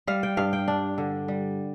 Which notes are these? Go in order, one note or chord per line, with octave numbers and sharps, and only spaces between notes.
G3 F5
G5
G2 F5
G5
D4
D3
G3